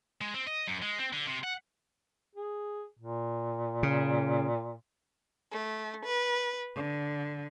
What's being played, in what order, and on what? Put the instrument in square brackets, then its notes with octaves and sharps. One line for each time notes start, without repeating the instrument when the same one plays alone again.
[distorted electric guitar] G#3
C4
D#5
F#2
G#3
C4
D3
C3
F#5
[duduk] G#4
A#2
[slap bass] C#3
[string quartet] A3
B4
D3